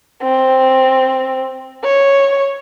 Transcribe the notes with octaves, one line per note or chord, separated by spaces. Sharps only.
C4
C#5